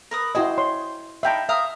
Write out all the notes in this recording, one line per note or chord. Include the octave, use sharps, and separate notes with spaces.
A#4 B4 D#6
E4 F#4 G#4 C5 D#5 G5
C#5 C6
D#4 E5 F5 G5 A5 B5
E5 F5 A#5 D#6